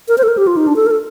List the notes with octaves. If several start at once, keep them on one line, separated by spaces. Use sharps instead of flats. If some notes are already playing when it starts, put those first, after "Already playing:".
A#4
C5
A4
A#4
G4
F4
D#4
D4
A4
A#4
A4